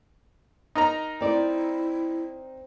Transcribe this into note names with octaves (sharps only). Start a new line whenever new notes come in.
D#4 A#4 A#5
C4 E4 D5